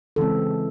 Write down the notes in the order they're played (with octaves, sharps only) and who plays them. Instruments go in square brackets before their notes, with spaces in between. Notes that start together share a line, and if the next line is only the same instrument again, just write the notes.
[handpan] C#3 E3 G#3 C4 A4